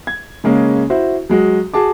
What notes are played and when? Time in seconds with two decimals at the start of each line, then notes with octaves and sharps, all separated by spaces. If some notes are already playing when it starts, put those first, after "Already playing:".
0.07 G#6
0.44 C#3 G#3 A#3 C#4
0.90 E4 F#4 C5
1.29 F#3 G#3 F#4
1.74 F#4 G#4 A5 D6